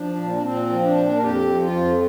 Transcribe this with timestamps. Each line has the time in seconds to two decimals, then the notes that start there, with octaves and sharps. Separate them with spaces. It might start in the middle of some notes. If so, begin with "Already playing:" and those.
Already playing: F3 D4
0.16 A#2
0.33 D4
0.43 A#2 C4
0.69 F3
0.82 D4
0.96 A#2
1.17 A#4
1.22 F2 G4
1.48 F3
1.62 F4
1.75 F2